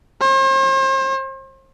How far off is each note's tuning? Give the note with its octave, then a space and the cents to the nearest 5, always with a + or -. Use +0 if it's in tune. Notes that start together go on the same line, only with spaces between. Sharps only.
C5 +40